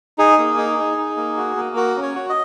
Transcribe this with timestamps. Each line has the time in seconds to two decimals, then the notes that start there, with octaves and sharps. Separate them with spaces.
0.18 D#4 G#4
0.39 A#3
0.58 D#4
0.79 D#4
0.98 D#4
1.17 A#3
1.37 F#4
1.56 A#3
1.76 F#4 A#4
1.96 C#4
2.02 C#5
2.15 F#4
2.29 D#5